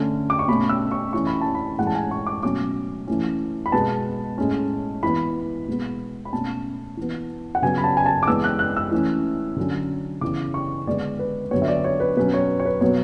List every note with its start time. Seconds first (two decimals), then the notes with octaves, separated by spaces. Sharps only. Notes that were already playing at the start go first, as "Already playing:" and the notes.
Already playing: D3 A3 C#4
0.30 D6
0.39 C#6
0.48 B2 A3 C#4 B5
0.69 E6
0.91 C#6
1.13 E3 A3 C#4 C#6
1.27 B5
1.41 A5
1.55 B5
1.78 A2 E3 G#3 C#4 F#5
1.87 A5
1.95 G#5
2.11 C#6
2.26 D6
2.43 B2 F#3 A3 C#4 D6
3.07 E3 A3 C#4
3.66 B5
3.72 B2 G#3 B3 A5
4.38 A2 G#3 C#4
5.03 E3 B3 B5
5.67 B2 G#3 B3
6.25 B5
6.33 B2 A3 C#4 A5
6.97 E3 B3
7.55 F#5
7.62 C#3 F#3 B3 G#5
7.78 B5
7.84 A5
7.97 G#5
8.06 A5
8.23 D6
8.27 E3 G#3 B3 E6
8.44 F#6
8.59 F#6
8.76 E6
8.92 E3 A3 C#4
9.56 D3 F#3 C#4
10.21 C#3 E3 B3 D6
10.54 C#6
10.87 D3 G#3 B3 D5
11.19 B4
11.51 D3 F#3 B3 C#5
11.62 E5
11.68 D5
11.84 C#5
12.00 B4
12.17 B2 F#3 C#4 B4
12.34 C#5
12.60 C#5
12.65 B4
12.81 B2 F#3 B3 C#5